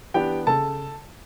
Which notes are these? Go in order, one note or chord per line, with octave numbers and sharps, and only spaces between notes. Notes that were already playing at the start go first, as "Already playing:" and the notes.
E3 B3 D4 G4 G5
C#3 A4 A5